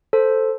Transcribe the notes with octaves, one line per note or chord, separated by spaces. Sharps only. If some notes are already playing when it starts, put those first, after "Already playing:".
A4 C5